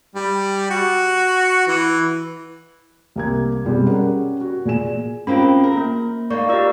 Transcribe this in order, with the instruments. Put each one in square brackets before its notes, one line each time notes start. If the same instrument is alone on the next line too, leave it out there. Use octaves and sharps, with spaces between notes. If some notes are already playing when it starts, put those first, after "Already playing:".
[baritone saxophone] G3
F#4
E3
[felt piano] C2 A#3 G#6
B2 G3 G#3 C4
C#4 G4 A#4 D5 F#5
F#4
A#2 G#4 G#5 E7
[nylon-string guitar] A#3 C4 G4 [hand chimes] C#4 F4 [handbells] B5
[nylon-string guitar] A#4
[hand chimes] A#3
[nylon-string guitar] A#3 D#4 [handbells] D5 F5 [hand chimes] C#6 G6
[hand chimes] F4 G4 [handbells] A#4 D5 E6